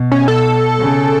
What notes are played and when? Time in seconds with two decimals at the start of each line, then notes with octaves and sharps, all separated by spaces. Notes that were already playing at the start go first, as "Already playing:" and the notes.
Already playing: B2
0.12 C#4
0.28 A4
0.80 C#3